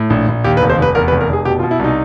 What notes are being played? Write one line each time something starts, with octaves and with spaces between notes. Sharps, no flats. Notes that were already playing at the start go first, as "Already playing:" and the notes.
Already playing: A2
A#1
A#1
D#2 G4
B4
F1
C5
F1 B4
E2 A#4
B4
F1
A#4
F1 G#4
B2 G4
F4
B2
E4
C2 D#4